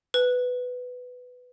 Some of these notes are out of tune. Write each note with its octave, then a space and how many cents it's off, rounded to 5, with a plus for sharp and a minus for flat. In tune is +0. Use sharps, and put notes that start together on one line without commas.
B4 +10